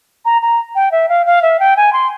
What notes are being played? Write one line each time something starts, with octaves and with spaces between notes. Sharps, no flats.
A#5
A#5
G5
E5
F5
F5
E5
G5
G#5
C6